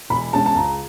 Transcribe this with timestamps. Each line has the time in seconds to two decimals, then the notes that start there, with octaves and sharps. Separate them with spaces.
0.10 E1 B5
0.33 E2 B2 G#3 C#4 A5
0.46 A5
0.55 C#2 A#5